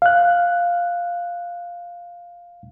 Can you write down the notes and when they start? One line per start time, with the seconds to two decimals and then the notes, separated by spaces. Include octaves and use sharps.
0.02 F5 F#6